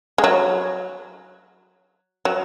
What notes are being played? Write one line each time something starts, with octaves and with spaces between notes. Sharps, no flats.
G#3
F#3
F#3